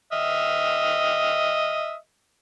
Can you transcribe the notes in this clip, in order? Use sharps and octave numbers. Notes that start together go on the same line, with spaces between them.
D#5 E5 F6